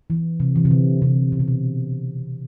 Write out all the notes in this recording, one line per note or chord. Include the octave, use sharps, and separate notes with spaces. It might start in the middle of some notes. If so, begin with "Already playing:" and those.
E3
C3
E3
C3
D3
C3
B2
C3
B2